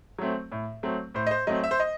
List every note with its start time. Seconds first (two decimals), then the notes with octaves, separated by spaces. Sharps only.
0.19 F#3 A3 C4
0.52 A2
0.83 F#3 A3 C4
1.14 A2 C5
1.27 D#5
1.31 C5
1.47 F#3 A3 C4 D#5
1.64 E5
1.71 C5
1.80 D#5